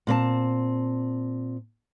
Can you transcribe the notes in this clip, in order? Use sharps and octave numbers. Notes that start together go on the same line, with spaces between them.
A#2 C4 C5 A5